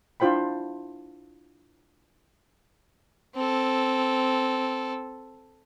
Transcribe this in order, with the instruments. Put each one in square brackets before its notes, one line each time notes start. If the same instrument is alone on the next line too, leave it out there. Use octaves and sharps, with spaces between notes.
[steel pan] D4 E4 F4 C5 G5 B5
[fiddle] C4 A4